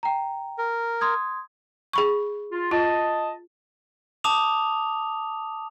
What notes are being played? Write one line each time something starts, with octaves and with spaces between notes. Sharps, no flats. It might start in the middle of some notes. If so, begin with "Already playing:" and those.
G5 A#5
A#4
C6 D#6 G#6
G#4 B5 C#6
F4
F4 D#5 A5
A5 D6 D#6 F7